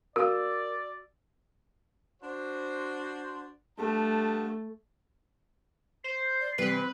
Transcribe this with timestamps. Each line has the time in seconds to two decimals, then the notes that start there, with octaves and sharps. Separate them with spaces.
0.16 F#4 A#4 D5 F5 E6
2.22 D4 F#4 C5
3.79 G2 A3 F#5 A5
6.04 C5 C7
6.40 D5
6.58 C3 E3 G3 C4 B4